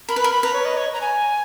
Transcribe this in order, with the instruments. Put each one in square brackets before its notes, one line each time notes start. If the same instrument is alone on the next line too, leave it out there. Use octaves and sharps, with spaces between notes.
[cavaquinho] A#4 [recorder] B5
[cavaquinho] B4
[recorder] B5
[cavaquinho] A#4
[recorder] B5
[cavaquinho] B4 [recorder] A#5
[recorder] C#5
D#5
C#5
A#5
G#5